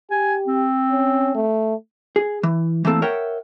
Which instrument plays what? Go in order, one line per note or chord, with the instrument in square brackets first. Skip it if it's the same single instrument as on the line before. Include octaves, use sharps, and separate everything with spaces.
[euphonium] G4 [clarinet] G#5
[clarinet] C4
[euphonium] C#4
A3
[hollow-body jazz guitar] G#4
E3
E3 A3 A#3 C4 A4
A#4 C#5 E5 F#5 G5